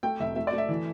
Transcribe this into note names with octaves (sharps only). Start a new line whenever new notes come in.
A3 G5
F1 E5
A3 E5
D5
A3
E5
E3